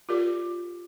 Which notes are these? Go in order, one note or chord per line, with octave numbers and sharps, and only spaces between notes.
F4 G4 A#4 D5